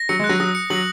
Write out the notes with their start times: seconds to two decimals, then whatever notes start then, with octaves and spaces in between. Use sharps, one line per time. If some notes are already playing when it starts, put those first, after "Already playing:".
Already playing: A#6
0.09 F#3 C#7
0.19 G#3
0.24 F#6
0.29 F#3
0.40 F#3 D#6
0.55 C#7
0.70 F#3 F#7